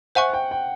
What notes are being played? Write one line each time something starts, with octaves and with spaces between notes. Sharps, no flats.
C5 E5 F#5 G#5 C#6 F#6
G5
G5